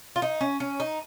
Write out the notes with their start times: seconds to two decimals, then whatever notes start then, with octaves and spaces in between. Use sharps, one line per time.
0.16 F4
0.22 D#4
0.41 C#4
0.60 C#4
0.80 D#4